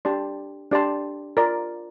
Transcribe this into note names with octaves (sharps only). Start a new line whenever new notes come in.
D4 G4 D5 A5 C6
D4 G4 D5 A5 C6
F4 A#4 D5